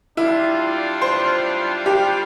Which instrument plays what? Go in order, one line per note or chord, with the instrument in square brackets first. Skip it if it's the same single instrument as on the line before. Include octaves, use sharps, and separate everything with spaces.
[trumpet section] G3 D4 F4 [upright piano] E4
[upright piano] C5
G4